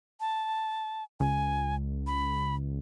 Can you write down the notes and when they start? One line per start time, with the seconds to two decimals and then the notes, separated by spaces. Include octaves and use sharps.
0.20 A5
1.20 C#2 G#5
2.07 B5